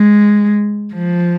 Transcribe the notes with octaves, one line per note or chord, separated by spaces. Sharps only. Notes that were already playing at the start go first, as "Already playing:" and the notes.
Already playing: G#3
F3